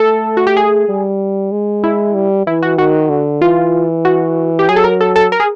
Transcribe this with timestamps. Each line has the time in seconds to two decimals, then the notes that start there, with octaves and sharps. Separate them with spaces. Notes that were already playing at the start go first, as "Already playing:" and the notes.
Already playing: A3 A4
0.37 F#4
0.47 G4
0.57 G#4
0.89 G3
1.52 G#3
1.84 E4
2.15 G3
2.47 E3 E4
2.63 F#4
2.78 D#3 F#4
3.10 D3
3.41 E3 F4
4.05 F#4
4.59 G4
4.69 F#3 G#4
4.76 A4
4.84 A#4
5.01 A4
5.16 A4
5.32 A#4
5.40 G#4